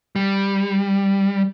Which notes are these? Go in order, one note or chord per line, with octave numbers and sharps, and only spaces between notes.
G3